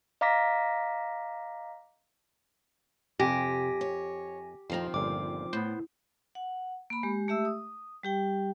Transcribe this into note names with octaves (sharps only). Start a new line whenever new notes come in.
D#5 F5 A#5 D6 A#6 B6
F2 C3 G4 G#5 A#6
C#5
F2 D#3 F3 C4 A#5
G1 A#2 D6
A2 B3 C5
F#5
A#3 B5
G#3 G4
A3 G4 E5 E6
D#6
G3 G4 G5